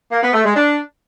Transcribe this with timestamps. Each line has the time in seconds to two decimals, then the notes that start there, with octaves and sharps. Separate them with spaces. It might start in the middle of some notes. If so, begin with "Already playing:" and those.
0.12 A#3
0.23 B3
0.34 A3
0.44 G#3
0.55 D4